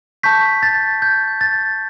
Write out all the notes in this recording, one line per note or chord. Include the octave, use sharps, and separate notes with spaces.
A5 C#6 G6 B6
A6
G6
A6